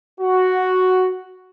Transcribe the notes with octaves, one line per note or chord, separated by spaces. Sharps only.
F#4